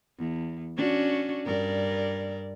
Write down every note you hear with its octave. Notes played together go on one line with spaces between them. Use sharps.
E2
C#4 D4 F#4
G2 A#4 D5